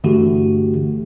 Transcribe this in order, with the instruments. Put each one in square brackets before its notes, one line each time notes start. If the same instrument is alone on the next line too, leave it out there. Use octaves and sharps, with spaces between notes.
[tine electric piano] G2 D3 E3 A3 F#4 G4